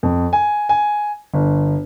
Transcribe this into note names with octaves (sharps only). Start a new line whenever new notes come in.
F2
G#5
G#5
G1